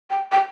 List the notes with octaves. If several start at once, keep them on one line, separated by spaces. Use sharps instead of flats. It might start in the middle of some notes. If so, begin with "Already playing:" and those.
G5
G5